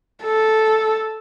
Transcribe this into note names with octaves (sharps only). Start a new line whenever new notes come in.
A4